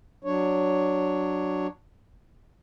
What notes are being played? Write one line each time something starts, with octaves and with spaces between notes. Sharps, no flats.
F#3 D4 C#5